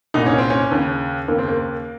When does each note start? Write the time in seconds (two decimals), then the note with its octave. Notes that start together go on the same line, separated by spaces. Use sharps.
0.14 C2 A#2 D#4
0.26 C#4
0.38 C4
0.50 C#4
0.72 D#2 C#3
1.28 D#2 C#3 A#3
1.38 C4
1.48 A#3